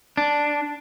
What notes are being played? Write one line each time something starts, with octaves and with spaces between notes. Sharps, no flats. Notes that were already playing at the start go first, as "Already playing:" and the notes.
D4